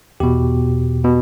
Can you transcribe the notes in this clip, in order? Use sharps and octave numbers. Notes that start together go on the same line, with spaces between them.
E2 B2 G4
B2